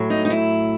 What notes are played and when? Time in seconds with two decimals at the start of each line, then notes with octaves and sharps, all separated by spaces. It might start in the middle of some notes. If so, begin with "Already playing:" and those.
Already playing: A2 F#3
0.10 D#4
0.25 D#4
0.30 E4